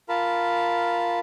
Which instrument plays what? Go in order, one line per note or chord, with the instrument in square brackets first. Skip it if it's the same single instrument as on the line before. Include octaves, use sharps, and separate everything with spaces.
[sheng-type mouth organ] F4 A#4 A5 B5